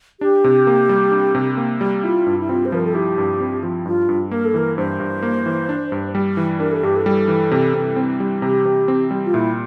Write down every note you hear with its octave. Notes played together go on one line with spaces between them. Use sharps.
D4 G4
C3
A#3
G3
D4
C3
A#3
G3
E4 F4
G2
E4
C4 F4
C5
F3 A#4
A4
E4 G4
G2
C4
F3
G2 F4
G2
A#3 A#4
A4
E3 A#4
G2 C5
G2
A#3
E3
D4
G2
G3
E3
D4 A#4
A4
G2 G4
A4
G3
E3
C3
C3
C4
G3
C3 G4
C3
C4
G3
F4
A#2 E4